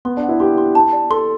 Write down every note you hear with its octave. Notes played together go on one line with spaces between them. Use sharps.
B3 C6
D4
F#5
E4
G4 C6
C6
A5
D5
A4 C6